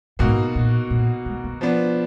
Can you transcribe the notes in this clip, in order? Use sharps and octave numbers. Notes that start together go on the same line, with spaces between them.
G#2 B2 A#3 D#4 F#4
A#2
A#2
G#3
A#3
F3 B3 D4